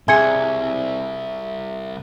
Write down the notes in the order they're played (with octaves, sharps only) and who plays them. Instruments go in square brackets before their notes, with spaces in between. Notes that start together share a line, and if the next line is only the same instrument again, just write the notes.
[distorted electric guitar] C2 [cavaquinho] G#4 C6 [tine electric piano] E5 [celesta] G#5 G#6 C#7